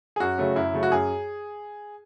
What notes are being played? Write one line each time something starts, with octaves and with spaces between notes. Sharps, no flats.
G#4
F#2 F#4
C#3 F#3 A3 C#4
F#2 E4
C#3 F#3 A3 C#4
F#4
F#2 G#4